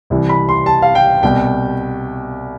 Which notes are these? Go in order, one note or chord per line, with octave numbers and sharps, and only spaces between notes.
C2 C3 E3
B5
C6
A5
F5
G5
C2 B2 G5